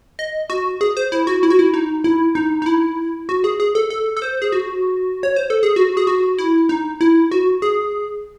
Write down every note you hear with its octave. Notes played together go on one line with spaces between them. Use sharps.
D#5
F#4
G#4
C5
E4
F#4
E4
F#4
E4
D#4
E4
D#4
D#4
E4
F#4
G#4
G#4
A4
A4
A4
C5
G#4
F#4
C#5
C5
A4
G#4
F#4
G#4
F#4
E4
D#4
E4
F#4
G#4